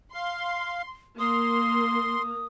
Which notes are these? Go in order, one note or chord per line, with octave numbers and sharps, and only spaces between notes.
F5 C6
A#3 C6 D#6